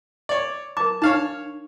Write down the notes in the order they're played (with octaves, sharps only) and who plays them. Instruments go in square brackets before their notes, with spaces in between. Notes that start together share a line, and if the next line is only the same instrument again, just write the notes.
[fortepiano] C#5 D5
[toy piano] A#4 D6 [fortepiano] A5
[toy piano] D4 D#4 [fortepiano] C#5 F5 A5